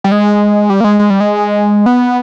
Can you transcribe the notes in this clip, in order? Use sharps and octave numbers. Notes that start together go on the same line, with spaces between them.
G3
G#3
G3
A#3
G#3
G#3
G3
G#3
B3